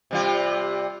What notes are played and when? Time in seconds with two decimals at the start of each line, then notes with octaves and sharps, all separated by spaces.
0.11 C3 G3 F4